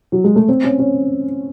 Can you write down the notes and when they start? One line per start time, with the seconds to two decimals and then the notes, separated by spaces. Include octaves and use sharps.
0.12 F#3
0.24 G#3
0.36 A3
0.48 C4
0.64 C#4
0.79 C#4